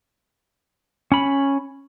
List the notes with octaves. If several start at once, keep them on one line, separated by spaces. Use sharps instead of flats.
C#4 B5